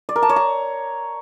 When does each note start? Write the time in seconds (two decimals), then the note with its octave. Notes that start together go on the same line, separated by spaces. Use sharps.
0.09 D5
0.16 A#4
0.23 A5
0.29 C#5
0.36 A#5